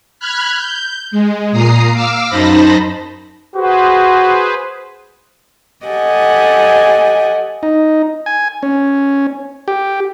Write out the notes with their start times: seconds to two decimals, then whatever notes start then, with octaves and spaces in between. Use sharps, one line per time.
0.20 B5 F6 F#6 G#6
0.57 G6
1.11 G#3
1.52 A#2 A#5 D#6 C7
1.92 F5 D6 E6 F6
2.29 F#2 D#4 C5 A5 B5 A#6
3.55 F#4 G#4 B4 C5
5.85 G4 A4 D#5 F#5 G#5
7.63 D#4
8.26 G#5
8.63 C#4
9.68 G4